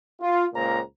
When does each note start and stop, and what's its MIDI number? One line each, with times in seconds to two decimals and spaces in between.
0.21 0.46 65
0.54 0.80 37
0.54 0.80 46
0.54 0.80 58
0.54 0.80 72
0.54 0.80 82